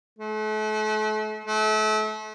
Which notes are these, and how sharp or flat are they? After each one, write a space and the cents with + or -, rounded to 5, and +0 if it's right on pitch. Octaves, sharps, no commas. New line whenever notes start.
A3 -40
A3 -35